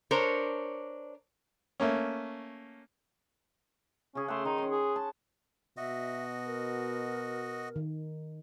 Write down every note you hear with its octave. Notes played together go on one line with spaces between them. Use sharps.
D4 A#4 C5 C#5
A3 A#3 C#4
C#3 C#4 G#4
A3 F#5 C6
D#3 D#4
C#4 C6
G#4
A5
B2 F#4 D#5 E5
A#4
D#3